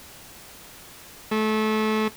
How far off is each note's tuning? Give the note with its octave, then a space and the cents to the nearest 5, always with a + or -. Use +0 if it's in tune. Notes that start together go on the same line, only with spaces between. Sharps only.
A3 -25